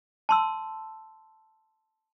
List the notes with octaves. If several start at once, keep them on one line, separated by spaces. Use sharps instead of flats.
A5 C6 E6